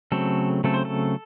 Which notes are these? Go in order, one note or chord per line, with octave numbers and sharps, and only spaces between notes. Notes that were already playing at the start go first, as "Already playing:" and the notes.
C#3 F#3 A3 C4 A4
C#3 F#3 A3 C4 A4
C5
A4